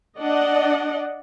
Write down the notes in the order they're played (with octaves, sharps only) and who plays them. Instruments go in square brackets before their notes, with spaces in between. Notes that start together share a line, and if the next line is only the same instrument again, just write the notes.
[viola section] D4 D5 D#5 F#5